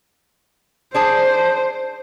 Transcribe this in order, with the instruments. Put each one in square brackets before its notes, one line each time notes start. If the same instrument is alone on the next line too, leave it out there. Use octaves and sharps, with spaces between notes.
[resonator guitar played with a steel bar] D4 G#4 A5 [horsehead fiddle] C5